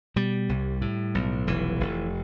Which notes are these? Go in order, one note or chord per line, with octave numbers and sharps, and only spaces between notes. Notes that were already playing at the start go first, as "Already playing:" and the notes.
B2 G3
C2
A2
B1
F1 E3
F1